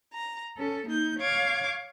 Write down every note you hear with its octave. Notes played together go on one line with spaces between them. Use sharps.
A#5
C#4 A4
A#3 D#4 G6
C#5 F5 C#6 D6 G#6